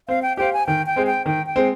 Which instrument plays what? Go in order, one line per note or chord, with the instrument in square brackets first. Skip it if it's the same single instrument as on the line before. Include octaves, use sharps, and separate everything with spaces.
[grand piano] C4 [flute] F5
[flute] G5
[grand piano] G4 C5 F5 [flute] G5
[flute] G#5
[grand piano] D#3 [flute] G5
[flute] G5
[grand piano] G#3 C4
[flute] G5
[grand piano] D#3 [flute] G5
[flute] G5
[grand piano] G#3 C4